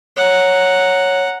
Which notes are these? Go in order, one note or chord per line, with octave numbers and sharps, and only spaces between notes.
C#5 F#5 A#5